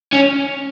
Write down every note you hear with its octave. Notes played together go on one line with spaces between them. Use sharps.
C#4